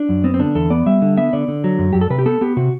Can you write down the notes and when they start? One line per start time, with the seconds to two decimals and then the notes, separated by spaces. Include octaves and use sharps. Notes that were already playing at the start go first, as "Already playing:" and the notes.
Already playing: D4
0.09 F#2
0.24 B3 C4
0.34 C4
0.39 D3 D4
0.55 E2 A4
0.70 B3 D5
0.86 G3 E5
1.02 D3
1.17 B3 E5
1.33 D3 D5
1.48 D3
1.64 F#3
1.79 F#2
1.93 F#2 G4
2.01 A4
2.10 C3 B4
2.19 G4
2.26 B3 A4
2.41 B3 G4
2.57 C3 F#4